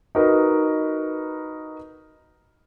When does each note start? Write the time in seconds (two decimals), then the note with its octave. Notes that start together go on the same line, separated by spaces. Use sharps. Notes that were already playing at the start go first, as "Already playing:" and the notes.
0.15 D#4 F#4 A#4 B4 D#5